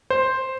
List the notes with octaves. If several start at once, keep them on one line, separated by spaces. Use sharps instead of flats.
C5